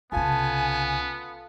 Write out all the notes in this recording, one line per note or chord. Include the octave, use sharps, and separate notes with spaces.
C2 C#3 B3 F4 A4 G#5